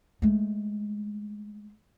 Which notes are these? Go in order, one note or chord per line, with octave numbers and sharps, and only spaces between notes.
G#3 A3